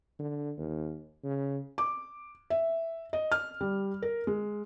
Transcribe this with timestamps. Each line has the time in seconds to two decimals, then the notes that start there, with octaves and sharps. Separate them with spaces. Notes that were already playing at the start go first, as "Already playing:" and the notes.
0.19 D3
0.58 D#2
1.24 C#3
1.78 D6
2.50 E5
3.13 D#5
3.32 F6
3.61 G3
4.02 A#4
4.27 G#3